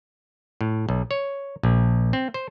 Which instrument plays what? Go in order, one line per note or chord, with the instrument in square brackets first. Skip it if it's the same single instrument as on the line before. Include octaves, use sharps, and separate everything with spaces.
[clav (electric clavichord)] A2
B1
C#5
A#1
C4
C5